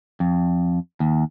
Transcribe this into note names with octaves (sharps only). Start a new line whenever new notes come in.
F2
D#2